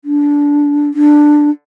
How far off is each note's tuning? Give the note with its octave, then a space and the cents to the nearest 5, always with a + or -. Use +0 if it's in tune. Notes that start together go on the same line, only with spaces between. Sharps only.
D4 -15
D4 +10